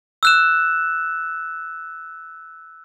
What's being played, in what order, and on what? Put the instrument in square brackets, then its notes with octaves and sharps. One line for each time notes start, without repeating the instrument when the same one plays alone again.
[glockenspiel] E6 F#6 E7